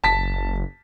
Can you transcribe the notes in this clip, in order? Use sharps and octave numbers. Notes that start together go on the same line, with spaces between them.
F#1 A5 B6